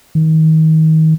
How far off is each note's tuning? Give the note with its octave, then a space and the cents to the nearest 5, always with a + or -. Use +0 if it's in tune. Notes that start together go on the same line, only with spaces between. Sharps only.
D#3 +30